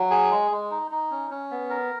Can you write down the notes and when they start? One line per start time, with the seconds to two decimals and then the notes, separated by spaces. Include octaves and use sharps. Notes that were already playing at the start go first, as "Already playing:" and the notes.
Already playing: F#3
0.11 G#4
0.31 G#3
0.51 G#3
0.71 D#4
0.91 D#4
1.11 C#4
1.31 C#4
1.51 B3
1.70 A#4